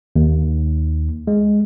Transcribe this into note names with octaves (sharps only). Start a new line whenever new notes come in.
D#2
G#3